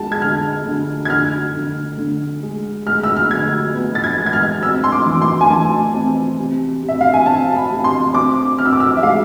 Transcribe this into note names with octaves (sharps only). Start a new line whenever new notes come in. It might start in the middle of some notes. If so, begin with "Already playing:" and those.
Already playing: G#3 A5
G#6
D3 F6
D3
G#6
D3 F6
D3
D3
G#3
G#3 F6
E6
F6
D3 G#6
B3
A6
G#6
G#3
G#6
F6
C4 E6
C6
D6
E3
C6
G#5
E3 A5
C4
C3
C3
E5
F5
G#5
C4 A5
B5
C3
C6
C4 D6
C4 F6
E6
D6
E6
E5
G#3 F5